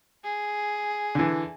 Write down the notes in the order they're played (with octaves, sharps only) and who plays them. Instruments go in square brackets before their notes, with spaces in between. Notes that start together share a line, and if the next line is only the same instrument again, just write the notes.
[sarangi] G#4
[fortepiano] D3 E3